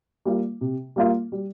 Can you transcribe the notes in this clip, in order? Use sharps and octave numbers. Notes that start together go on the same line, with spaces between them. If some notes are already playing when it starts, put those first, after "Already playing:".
G3 A#3 F4
C3
G3 A#3 F4
G3